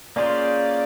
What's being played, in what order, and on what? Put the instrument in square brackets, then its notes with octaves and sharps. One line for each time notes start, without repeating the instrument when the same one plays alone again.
[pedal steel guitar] A#3 C#4 F4 G#4 C5 [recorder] D5